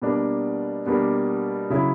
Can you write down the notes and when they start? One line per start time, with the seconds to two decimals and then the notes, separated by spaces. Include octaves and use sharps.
0.02 B2 G3 A#3 D4
0.86 B2 G3 A#3 D4
1.70 C#3 F#3 C#4 E4